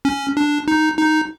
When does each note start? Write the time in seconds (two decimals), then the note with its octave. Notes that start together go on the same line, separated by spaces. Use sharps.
0.05 C#4
0.37 D4
0.68 D#4
0.99 D#4